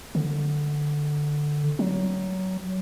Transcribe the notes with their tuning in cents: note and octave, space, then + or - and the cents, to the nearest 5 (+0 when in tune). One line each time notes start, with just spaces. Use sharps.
D3 +5
F#3 +20